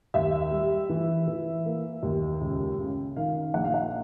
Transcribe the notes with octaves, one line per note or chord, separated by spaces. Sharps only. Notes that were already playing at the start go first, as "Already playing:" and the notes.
D#2 E5
G3
E3
E3
A#3
D#2
C#2
C#3
D#3 F5
A#1 F#5
F5
F#5